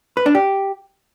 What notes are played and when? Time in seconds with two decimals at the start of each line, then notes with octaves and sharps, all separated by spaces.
0.17 B4
0.26 D4
0.35 G4